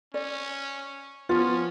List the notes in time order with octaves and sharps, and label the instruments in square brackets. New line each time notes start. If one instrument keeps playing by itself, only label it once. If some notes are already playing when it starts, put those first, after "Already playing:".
[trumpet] C#4 [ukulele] D5
[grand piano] F3 A6 [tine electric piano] B3 [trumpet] C#4 [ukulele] F4